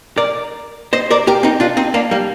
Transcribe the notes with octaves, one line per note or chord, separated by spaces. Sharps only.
A#4 D5
C5 D#5
A#4 D5
G4 A#4
C4 D#4
D4 F4
C4 D#4
A#3 D4
G3 A#3